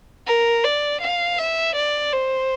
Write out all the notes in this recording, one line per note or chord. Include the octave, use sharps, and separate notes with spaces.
A#4
D5
F5
E5
D5
C5